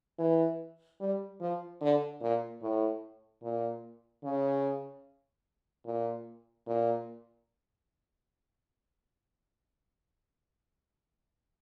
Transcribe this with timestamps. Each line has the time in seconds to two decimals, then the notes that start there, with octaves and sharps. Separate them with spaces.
0.19 E3
1.00 G3
1.41 F3
1.82 D3
2.22 A#2
2.62 A2
3.43 A#2
4.24 C#3
5.86 A#2
6.67 A#2